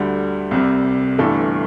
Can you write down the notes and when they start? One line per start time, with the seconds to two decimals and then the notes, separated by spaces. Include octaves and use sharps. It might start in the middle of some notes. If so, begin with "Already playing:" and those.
Already playing: D2 D3 G3
0.51 C2 C3 G3
1.18 G1 G2 E3 A3 A4